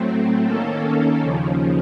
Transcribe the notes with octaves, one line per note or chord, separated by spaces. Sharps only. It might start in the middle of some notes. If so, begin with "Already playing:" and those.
Already playing: A2 F#3 A3 C4
D#3 A#3 C#4 A4
D#2 C#3 F3